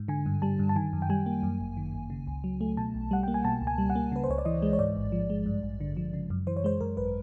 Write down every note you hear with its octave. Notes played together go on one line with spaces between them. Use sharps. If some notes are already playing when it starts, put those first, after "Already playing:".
Already playing: G#2
D3 G#5
G2
G3 A5
G2
A5
D#3 G#5
F#2
G5
G3 G#5
A#3
F#2
G1
D#3
G1
C#3
C#2
F#3
A3
B2 A5
B1
G3 F#5
A#3 G5
G#5
B2 A5
C#2
G#5
G3
F#5
A#3
C#3 B4
C5
C#2 C#5
D5
E3 D#5
G#3
C#5
G#2 D5
A1
F3
G#3
G2
A1
D3
F3
C#3
F#2
E3 C5
C#5
G#3 C5
F#2 A#4
G#1 B4